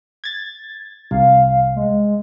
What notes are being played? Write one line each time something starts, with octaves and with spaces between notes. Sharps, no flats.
G#6 A6
C2 F5
G#3